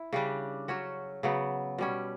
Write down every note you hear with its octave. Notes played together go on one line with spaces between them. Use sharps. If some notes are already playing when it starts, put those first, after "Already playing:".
Already playing: E4
C#3 G3 D4 G4
F#3 C#4 F#4
C#3 F#3 B3
B2 G3 C#4